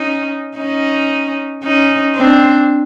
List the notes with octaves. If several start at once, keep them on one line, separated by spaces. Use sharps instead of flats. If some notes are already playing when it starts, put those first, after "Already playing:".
Already playing: C#4 D#4
C#4 D#4
C#4 D#4
C4 D4